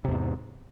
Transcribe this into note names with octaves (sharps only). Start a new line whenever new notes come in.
E2 G#2 C3